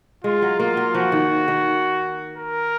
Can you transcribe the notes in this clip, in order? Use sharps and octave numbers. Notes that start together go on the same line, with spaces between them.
G#3 F4
F#3
A#3 F4
F#3
F3 F#4
D#3
D#3
A#4